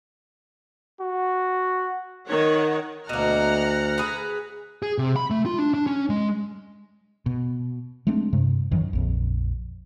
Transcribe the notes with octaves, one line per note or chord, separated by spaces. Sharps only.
F#4
D#3 C#5 F#5
D2 B2 A#3 F#5 A#5 F6
G#4 B4
G#4
C3
B5
A3
F4
D4
D4
C#4
G#3
B2
G#3 A3 C4 D4
G2 C3
F#2 D#3 E3 F#3
A#1 F2